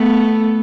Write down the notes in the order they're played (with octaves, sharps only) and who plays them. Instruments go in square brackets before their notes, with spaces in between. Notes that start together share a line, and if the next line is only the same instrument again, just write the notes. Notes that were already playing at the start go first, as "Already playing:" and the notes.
Already playing: [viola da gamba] A3 B3